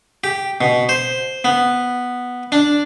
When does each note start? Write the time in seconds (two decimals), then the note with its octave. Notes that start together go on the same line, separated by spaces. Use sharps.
0.24 G4
0.61 B2
0.89 C5
1.44 B3
2.52 D4